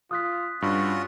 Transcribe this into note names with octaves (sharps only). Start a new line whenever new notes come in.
F4 D#6 F#6 B6
G2 C#4 F4 F#4